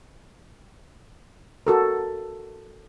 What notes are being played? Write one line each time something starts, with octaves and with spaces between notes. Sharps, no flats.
F#4 A4 A#4